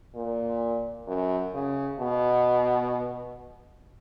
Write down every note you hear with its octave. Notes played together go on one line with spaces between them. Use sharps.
A#2
F#2
C#3
B2